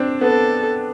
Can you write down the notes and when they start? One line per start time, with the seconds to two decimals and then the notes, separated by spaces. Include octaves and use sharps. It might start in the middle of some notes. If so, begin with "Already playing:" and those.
Already playing: C4 D4
0.21 B3 A4